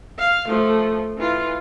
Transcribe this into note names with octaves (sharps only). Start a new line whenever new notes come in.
F5
F3 A3
E3 F4